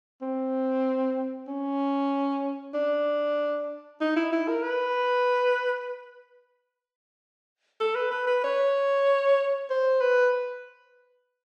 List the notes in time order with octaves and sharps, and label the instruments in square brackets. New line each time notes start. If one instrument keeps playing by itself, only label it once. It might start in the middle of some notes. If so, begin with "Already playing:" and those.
[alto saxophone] C4
C#4
D4
D#4
E4
E4
A#4
B4
A4
B4
B4
B4
C#5
C5
B4